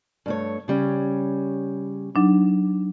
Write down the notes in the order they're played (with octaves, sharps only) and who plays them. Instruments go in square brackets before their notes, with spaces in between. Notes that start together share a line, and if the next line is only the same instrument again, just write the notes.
[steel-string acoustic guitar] G2 A3 C#5
C#3 G3 C#4
[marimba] F#3 D4 D#4